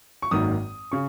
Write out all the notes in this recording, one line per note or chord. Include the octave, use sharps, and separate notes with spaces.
C#6
G#1 F#2 D#3 F#3 A#3 D#6
C#3 C#6